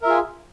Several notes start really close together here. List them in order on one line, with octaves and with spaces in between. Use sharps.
A#4 E5 F4 G#4